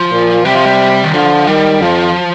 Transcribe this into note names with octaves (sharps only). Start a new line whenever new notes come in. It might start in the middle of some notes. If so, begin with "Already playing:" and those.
Already playing: F3
A#2
C3 G3
F3
G3
D#3
D3 F3
D#3 G3
F2 F3